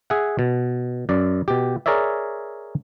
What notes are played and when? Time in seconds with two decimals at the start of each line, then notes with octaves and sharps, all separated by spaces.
0.10 G#4 E5 F#5
0.39 B2
1.09 F#2 D5
1.48 B2 G4
1.86 G#4 A#4 C#5 D5 E5